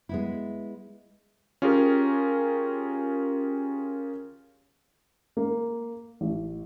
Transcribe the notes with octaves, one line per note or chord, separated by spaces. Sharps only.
G#3 B3 E4
C#4 F4 G4 G#4 A#4
A#3
A1